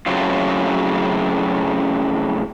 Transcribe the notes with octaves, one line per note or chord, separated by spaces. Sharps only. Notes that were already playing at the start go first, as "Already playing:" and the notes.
F#2 A2 C#3 F#3 C4 F4